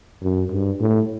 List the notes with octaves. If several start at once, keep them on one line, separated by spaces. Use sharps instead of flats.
F#2
G2
A2